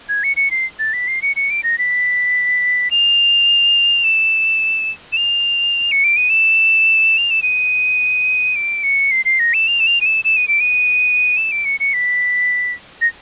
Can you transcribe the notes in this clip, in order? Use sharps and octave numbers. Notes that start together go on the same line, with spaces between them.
G#6
C#7
C#7
C7
A6
B6
C7
C#7
C#7
D7
A#6
B6
F7
E7
E7
F7
C#7
D7
D#7
E7
F7
E7
D#7
D7
C#7
C7
C7
A#6
E7
F7
E7
F7
D#7
E7
E7
D#7
D7
D#7
E7
D7
C#7
C#7
B6
A#6